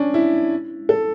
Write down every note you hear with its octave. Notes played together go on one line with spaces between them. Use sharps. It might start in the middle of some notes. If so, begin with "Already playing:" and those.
Already playing: C#4 D4
E4
A4